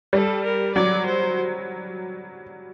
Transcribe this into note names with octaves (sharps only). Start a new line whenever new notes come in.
G3 A4
A#4
F#3 D5
C5